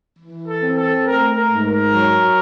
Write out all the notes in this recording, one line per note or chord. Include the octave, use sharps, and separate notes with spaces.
E3
A4
C4
A4
A3 A#4
A#4
G#2
A#4
F#3